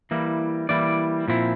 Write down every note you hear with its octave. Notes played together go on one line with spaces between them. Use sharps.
E3 G3 A#3 E4
E3 G3 A#3 E4 D5
A#2 F3 C4 E4